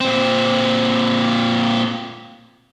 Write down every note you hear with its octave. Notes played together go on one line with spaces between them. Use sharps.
A#2 C4